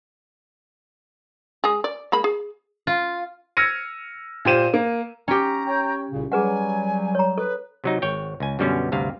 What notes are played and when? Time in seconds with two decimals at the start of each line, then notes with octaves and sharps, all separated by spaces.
1.64 G#3 G#4
1.84 D5
2.12 G#3 A#3 B5
2.24 G#4
2.87 F4
3.57 E6 F6 G#6 A#6 C#7 D#7
4.45 A#2 G4 C5 D#7 E7
4.74 A#3
5.28 C#4 G4 A#5
5.67 C#5 G5
6.11 C2 A#2 C#3
6.32 F#3 G3 G#4 B4 F#5 G#5
7.15 C#5 A#5
7.38 A4 B4
7.84 C3 F#3 D#4
8.02 G#1 C#5 G5
8.40 C#2 G#5
8.59 F#2 B2 D3 G3 B3 C#4
8.92 D2 G2 C3 F5